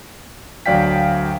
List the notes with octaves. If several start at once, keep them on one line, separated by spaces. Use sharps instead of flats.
D2 F#3 D5 F5 G5 B6